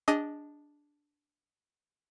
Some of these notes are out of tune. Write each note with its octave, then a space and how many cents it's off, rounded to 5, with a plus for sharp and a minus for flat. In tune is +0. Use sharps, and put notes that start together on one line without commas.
D4 -5 G#4 -25 D#5 +10